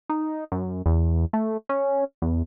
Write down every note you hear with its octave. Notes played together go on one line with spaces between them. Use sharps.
D#4
F#2
E2
A3
C#4
E2